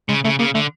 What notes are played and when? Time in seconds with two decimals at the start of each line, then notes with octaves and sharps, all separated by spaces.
0.09 C#3 G#3
0.24 C#3 A3
0.39 C#3 A#3
0.54 D3 A3